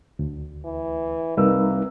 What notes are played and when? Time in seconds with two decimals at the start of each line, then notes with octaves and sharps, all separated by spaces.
0.19 D2
0.65 E3
1.37 C2 A#3 D#4 A#4 B4 E6